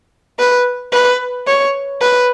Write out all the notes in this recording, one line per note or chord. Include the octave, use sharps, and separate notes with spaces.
B4
B4
C#5
B4